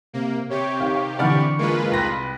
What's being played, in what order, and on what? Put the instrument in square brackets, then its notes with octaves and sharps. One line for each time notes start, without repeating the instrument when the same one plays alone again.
[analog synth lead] C3 [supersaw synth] A#3
[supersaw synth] C3 G4 [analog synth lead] C#5
[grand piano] D#3 [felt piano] F5
[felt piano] D3 E3 B5 [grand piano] D5 F#5 F6 [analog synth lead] C#6
[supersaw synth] G#3 F4 B4 [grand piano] A#3
[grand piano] C2 A#6 [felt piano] G5 C6 F#6 [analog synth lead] B5